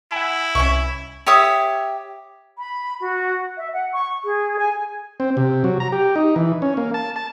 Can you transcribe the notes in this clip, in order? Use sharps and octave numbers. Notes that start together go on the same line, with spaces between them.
E4 F#5 G#5
C2 C#4 E5 C#6
G4 C#5 E5 D#6
B5
F#4
E5
F#5
C#6
G#4
G#5
C4
C3
F#3
A#5
G4
D#4
E3
C#4
A#3
A5
A5